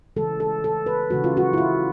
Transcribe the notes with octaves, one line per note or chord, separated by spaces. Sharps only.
C#3 E3 G#3 A4
A4
A4
B4
C#3 E3 G#3 F#4
F4
F#4
E4
F4